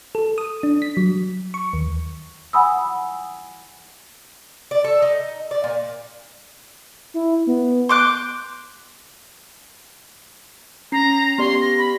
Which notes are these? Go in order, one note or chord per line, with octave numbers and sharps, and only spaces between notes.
A4
D#6
D4
B6
F#3
C#6
D#2
F#5 G#5 B5 D#6 E6
D5
A4
D#4
D5
A#2
E4
B3
C6 D6 F#6 G6
C#4 A#5 C7
B3 G4 D5 C6
A#6
B5